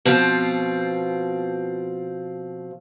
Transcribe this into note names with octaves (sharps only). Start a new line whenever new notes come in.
B2 F3 C4 F4